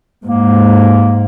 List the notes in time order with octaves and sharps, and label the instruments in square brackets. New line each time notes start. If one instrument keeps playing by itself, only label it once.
[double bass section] G#2 [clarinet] A#3